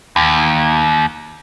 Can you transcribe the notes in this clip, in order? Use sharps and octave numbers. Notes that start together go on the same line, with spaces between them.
D#2